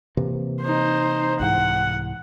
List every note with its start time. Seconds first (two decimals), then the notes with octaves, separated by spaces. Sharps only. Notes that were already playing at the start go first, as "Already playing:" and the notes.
0.17 C3 E3 A#3
0.63 D#4 C5
1.40 C2 G#2 E3 F#5